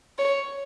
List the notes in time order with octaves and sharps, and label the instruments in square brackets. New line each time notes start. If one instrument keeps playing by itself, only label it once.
[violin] C#5